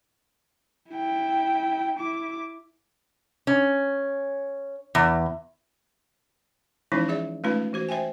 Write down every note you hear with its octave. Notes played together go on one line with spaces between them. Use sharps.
E4 G5
E4 D6
C#4
E2
E3 F3 G#3 C#4 D#4 E4
G#4 D5 E5
G#3 A3 C#4 D#4 F4 B4
E3 F#4 C5
C5 E5 G5 G#5